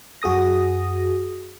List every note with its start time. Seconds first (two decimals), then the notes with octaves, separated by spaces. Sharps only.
0.22 F#2 F#4 G#4 D#6 A#6